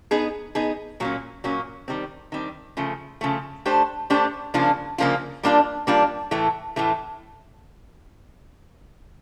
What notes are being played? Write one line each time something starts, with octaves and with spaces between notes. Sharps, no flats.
B3 D#4 G#4
B3 D#4 G#4
A#2 F#3 A#3 C#4
A#2 F#3 A#3 C#4
D#3 G3 C4
D#3 G3 C4
C#3 F3 A3
C#3 F3 A3
A3 D4 G4 C5
A3 D4 G4 C5
C#3 F3 A#3 D4 F4
C#3 F3 A#3 D4 F4
G3 A#3 D4 F4
G3 A#3 D4 F4
A2 E3 A3
A2 E3 A3